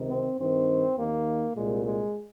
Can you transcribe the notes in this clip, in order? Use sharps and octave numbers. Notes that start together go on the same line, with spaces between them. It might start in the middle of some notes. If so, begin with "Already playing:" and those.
Already playing: C#2 C3 D#3
C4
G2 D#3 C4
D#2 D#3 A#3
C2 A#2 G#3
G#3